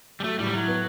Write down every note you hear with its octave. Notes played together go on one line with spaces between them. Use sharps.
G3
F#3 A3
A2 G3
E3
F#3 E4
B3